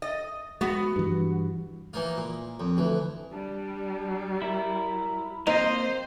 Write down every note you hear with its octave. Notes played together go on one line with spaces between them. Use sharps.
D#5
G#3 B3 F#4
G2 E3
E3 A#3 D#4 F4
A#2
F2
D2 E3
G3 D4
E4 A#4
A#3 C4 D#4 C5 D#5